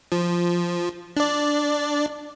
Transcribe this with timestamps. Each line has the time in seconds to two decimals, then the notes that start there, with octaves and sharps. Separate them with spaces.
0.12 F3
1.17 D4 D5